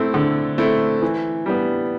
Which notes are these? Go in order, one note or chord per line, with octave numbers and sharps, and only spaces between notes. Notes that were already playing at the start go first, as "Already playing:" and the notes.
Already playing: A3 C4 E4
D3
A3 C4 E4
E3
G3 B3